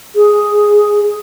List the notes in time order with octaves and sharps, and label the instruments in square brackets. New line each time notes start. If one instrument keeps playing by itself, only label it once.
[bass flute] G#4